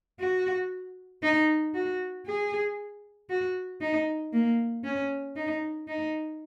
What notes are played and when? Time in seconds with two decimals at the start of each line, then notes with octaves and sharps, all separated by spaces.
0.20 F#4
1.23 D#4
1.75 F#4
2.26 G#4
3.30 F#4
3.81 D#4
4.33 A#3
4.85 C#4
5.36 D#4
5.88 D#4